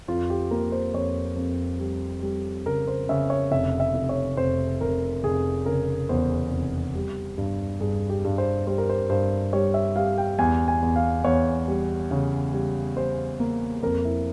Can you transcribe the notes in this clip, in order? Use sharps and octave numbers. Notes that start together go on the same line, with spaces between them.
F2 F4
G4
A#3 A#4
C5
F2 C#5
F2
G3
G3
C#3 A#4
C5
C#3 E5
C#5
F1 E5
E5
F1
C#5
F1 C5
F1 A#4
F1 G#4
C#3 A#4
E2 C5
F1
G3
G2
G2 G#4
G4
G2
C5
G3 C5
A#4
C5
G2 C5
G3 C#5
E5
G3 F5
G5
E2 G#5
G#5
E2
F5
E2 C#5
G3
C#3
G3
G3 C5
A#3
F2 A#4
E4